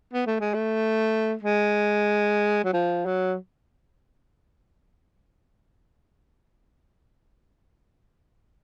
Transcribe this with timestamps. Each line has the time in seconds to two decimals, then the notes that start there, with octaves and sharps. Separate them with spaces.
0.13 B3
0.26 A3
0.40 G#3
0.54 A3
1.43 G#3
2.64 F#3
2.73 F3
3.06 F#3